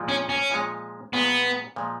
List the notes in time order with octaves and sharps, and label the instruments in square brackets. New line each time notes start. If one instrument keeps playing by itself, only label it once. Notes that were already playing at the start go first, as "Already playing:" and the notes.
Already playing: [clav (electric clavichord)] A#2 F3 G#3
[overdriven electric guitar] C#4
C#4
[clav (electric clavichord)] A#2 F3 G#3
[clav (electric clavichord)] A#2 F3 G#3 [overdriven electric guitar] B3
[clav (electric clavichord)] A#2 F3 G#3